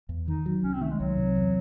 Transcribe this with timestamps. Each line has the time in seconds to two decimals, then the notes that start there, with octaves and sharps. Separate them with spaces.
0.09 E2
0.28 D#3 D#4
0.46 F#3
0.63 C2 C#4
0.73 C4
0.81 D#3 A3
0.91 G#3
1.00 C2 F#3
1.17 C3
1.36 E2